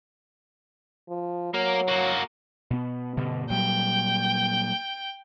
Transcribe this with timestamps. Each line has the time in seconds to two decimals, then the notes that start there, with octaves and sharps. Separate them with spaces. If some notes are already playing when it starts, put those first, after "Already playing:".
1.09 F3
1.54 F#3 A#3 A#4
1.88 A#3 F#4
2.70 B2 B3
3.17 G2 B2 D3
3.50 A#2 F#3 G3 G5